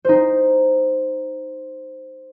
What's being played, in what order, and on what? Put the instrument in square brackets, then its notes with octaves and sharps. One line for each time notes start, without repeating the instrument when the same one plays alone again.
[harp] D#4 C5